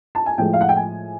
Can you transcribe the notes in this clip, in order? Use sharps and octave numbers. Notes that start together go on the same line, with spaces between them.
A5
G#5
A2 F3 G#3 G5
F5
F#5
G5
G#5